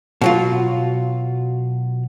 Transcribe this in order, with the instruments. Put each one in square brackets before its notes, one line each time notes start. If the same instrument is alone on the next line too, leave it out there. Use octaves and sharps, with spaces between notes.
[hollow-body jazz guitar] B2 F#3 F4